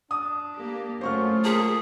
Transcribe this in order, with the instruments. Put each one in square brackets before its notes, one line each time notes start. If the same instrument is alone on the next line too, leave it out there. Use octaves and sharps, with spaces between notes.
[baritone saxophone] D4 [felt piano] D#6
[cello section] A#3 G4
[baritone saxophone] F#2 [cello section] A3 F4 [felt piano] C5 C#6 F6
[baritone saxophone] A#2 [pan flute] G#4 [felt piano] A5